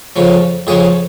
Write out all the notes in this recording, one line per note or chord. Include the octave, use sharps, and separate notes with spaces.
F2 C#3 F3
F2 C#3 F3 G#4